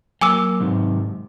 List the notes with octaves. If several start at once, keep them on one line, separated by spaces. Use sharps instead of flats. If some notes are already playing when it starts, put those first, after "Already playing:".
F#3 A#3 G#5 D6 E6
G#2 C3 D#3